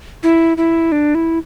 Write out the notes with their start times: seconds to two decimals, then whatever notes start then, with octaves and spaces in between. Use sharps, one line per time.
0.23 E4
0.57 E4
0.92 D4
1.15 E4